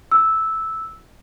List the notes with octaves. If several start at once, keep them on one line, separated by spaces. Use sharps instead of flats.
E6